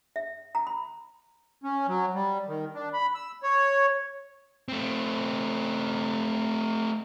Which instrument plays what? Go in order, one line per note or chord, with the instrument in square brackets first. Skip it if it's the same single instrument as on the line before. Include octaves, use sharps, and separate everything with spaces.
[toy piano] E5
A#5
B5
[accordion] C#4
F#3
G3
D#3
D4
B5
E6
C#5
[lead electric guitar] A3 C4